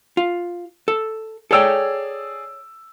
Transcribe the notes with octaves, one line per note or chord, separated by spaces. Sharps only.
F4
A4
G#4 A4 C#5 D5 G5 E6